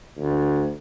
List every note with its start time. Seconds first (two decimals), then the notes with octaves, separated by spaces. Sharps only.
0.18 D2